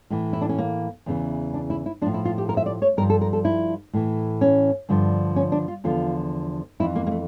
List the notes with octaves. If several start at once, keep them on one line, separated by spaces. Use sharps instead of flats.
A2 E3
E4
D4
C#4
A#3
E2 C#3 E3
D4
E4
E4
A2 F3 D4
E4
F4
G4
A#4
E5
D5
C#5
G2 F3 A#4
A4
A#4
A4
E4
A2 E3
C#4
G2 D3 F3
C#4
D4
F4
E2 D3 F3 F4
F2 E3 E4
A#3
A#3
A3